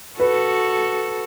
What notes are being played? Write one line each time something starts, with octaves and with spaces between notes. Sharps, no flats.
F#4 A4 B4